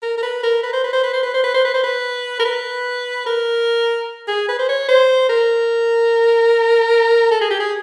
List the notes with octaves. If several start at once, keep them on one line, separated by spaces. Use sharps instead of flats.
A#4
A#4
B4
A#4
B4
C5
B4
C5
B4
C5
B4
C5
B4
C5
B4
C5
B4
A#4
B4
A#4
G#4
B4
C5
C#5
C5
A#4
A4
G#4
G4
G#4